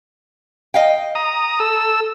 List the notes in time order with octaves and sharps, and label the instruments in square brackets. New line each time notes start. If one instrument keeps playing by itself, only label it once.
[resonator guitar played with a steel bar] D#5 F5 G5
[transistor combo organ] A#5 D#6
A4 E6